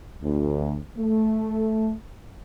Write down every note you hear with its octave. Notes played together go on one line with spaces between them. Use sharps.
D2
A3